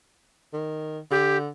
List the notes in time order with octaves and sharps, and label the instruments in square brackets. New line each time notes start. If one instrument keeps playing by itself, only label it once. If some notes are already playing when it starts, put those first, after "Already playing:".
[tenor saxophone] D#3
[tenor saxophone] D3 [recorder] G4